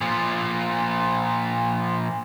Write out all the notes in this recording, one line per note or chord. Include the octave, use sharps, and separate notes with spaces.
A#2 F3